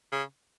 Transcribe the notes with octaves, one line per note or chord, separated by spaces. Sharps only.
C#3